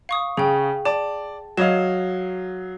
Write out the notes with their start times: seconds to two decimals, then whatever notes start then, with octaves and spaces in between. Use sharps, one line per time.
0.09 F5 C#6 D#6
0.37 C#3 G#4 G5
0.85 D5 A5
1.57 F#3 C#5 D#5 F5 E7